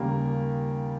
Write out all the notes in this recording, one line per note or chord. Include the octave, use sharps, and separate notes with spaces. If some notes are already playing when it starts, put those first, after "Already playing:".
Already playing: D#2 C#3 G3 A#3 A#4